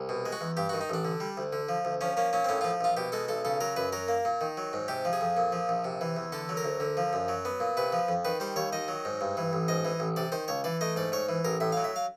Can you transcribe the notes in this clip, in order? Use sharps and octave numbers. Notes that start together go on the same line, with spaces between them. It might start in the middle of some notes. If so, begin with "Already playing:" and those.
Already playing: C2
B2
G#3
F#4
E2
G2 G4
F#4
D#3
D#4
A1 D4
D3
G3
D2
D3
F3
D2
F3 C#4
A#3 C#4
A#2 C#4
C4
A2 C#4
F3 F4
A#1 F4
B2 G4
G#3 A4
B1 A4
C#3 A4
F#3 A#4
F#2 B4
F#3 A#4
A#3
A#2
D#3
F#3
G#2
C3 G4
F3
G#4
F2
A#2
F3
A#1
C3
E3
E2
D3 A4
F#3
A#4
D2
D3
F3
F#2
F#3
B3
A#2
C3 B4
F3
F2
D#3 B4
G3 C5
D#2 C#5
D#3 D#5
F#3
G#2
G2
E3
A1
G#2 D#5
E3
A1
C3 D5
D#3 C5
C#2 C#5
E3 D5
A3 D#5
G#2 D5
G#2 C#5
E3
A1 A#4
A2 E5
F5
F#3
E5
F5